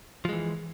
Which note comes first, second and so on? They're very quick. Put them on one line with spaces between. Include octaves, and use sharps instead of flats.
F3 G#3 E3